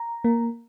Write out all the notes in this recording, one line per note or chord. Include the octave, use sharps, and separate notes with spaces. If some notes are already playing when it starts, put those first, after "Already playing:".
Already playing: A#5
A#3